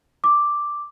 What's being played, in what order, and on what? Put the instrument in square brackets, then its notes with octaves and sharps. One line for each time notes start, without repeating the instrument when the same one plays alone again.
[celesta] D6